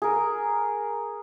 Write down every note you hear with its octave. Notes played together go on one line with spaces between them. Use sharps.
G#4 A#4